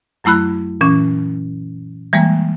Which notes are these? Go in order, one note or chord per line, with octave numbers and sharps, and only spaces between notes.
F#2 F#3 A3 E4 B5 F#6
A#2 E3 C#4
E3 G3 G#3 A#3